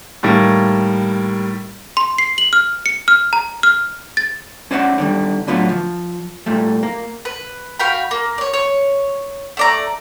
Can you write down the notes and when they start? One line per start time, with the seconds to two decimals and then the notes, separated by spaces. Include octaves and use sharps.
0.23 A2 D#3 G3 A#3
1.97 C6
2.18 C7
2.38 F#7
2.53 F6
2.86 C#7
3.08 F6
3.33 A#5
3.63 F6
4.17 A6
4.71 C#4 C5 D5 E5 F#5
4.98 D3 D#3 G3
5.47 A2 D3 F#3 B3 F4
5.69 F3
6.46 A#2 G3 A3
6.83 A#3
7.25 B4
7.79 F#4 F5 G5 B5
8.11 A#3
8.38 C#5 D5
8.54 C#5
9.57 A3 D5 A#5